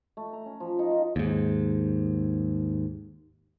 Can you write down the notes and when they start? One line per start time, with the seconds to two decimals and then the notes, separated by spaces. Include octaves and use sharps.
0.17 A3
0.33 A#5
0.46 C#4
0.60 F3
0.79 D#4
0.91 F4
1.16 D#2 G#2